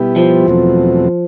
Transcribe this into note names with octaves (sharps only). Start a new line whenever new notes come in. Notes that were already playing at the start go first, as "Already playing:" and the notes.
Already playing: B2 G3 B3 E4 G4
F3
E2 B2 F#3 A3 C4